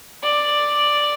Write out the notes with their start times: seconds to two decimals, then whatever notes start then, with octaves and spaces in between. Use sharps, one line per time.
0.23 D5